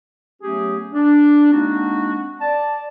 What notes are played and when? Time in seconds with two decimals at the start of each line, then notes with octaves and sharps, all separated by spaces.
0.42 F#3 A3 B3 C#4 G4 G#4
0.93 D4
1.52 G#3 A#3 C4 D4 D#4 F#4
2.41 D5 A5